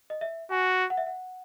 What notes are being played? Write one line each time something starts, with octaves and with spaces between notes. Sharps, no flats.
D#5
E5
F#4 G#5
F#5
E5
F#5